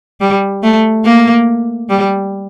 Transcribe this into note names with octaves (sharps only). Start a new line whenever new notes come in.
G3
A3
A#3
G3